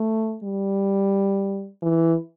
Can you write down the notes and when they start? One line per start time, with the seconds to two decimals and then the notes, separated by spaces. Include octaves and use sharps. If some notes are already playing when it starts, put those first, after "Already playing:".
Already playing: A3
0.44 G3
1.82 E3